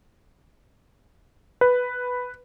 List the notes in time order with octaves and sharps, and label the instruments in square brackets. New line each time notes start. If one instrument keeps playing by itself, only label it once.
[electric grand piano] B4